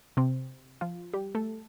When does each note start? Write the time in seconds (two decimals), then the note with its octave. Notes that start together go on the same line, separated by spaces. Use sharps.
0.17 C3 C4
0.81 F3 F4
1.14 G3 G4
1.35 A3 A4